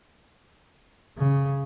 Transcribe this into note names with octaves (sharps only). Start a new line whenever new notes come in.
C#3